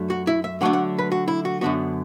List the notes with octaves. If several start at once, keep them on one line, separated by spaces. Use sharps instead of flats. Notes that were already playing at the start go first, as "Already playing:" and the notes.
Already playing: F#2 F#3 A3 D4
F#4
E4
E5
D3 F#3 A3 D4 F#5
F#5
B4
F#4
E4
F#4
F#2 D3 B3 D4 F#4